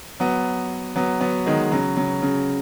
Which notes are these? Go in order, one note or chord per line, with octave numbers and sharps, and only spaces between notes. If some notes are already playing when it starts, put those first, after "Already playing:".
F#3 B3
F#3 B3
F#3 B3
D#3 G#3
C#3 F#3
C#3 F#3
C#3